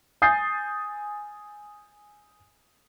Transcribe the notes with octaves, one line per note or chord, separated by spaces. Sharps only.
G#5 D#6 G6 A6 C7